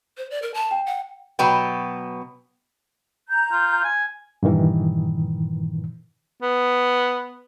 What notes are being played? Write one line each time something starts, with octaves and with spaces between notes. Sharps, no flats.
C5
D5
A#4
A5
G5
F#5
B2 F#3 B3 B4 G5
A#5 G6
F4
G#5
G2 A#2 D#3 E3
B3